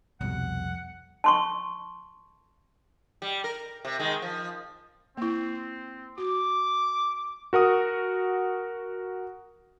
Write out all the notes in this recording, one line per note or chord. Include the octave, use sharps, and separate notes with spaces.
C2 F2 B2 G3 F#5
A5 C6 C#6
G3
A#4
C3
D#3 G#3
F3
A#3 C4 E4
F#4 D6
F#4 A#4 F#5 D#6